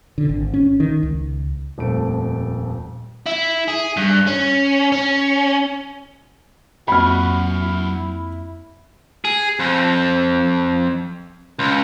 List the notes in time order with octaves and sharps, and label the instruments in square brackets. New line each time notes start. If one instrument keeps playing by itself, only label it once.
[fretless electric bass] D3
G#1
C#4
D#3
C#2
[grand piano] D#1 F2 A3 D7
[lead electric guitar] E4
G#4
G2
C#4
C#4
[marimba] F2 A#3 C4 [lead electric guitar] F#3 E5 [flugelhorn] F#4 [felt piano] B5 F6
[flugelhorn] E4
[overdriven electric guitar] G#4
F2
C#2